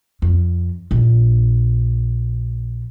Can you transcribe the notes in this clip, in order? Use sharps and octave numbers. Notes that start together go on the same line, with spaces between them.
F2
A#1